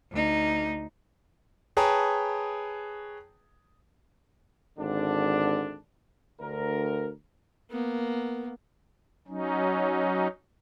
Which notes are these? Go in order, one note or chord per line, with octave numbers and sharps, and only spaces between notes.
D2 D#4
G#4 B4 C#5 G5 A5 A#5
G#1 D3 D4
D2 A#4
A#3 B3
F#3 C#4 D#4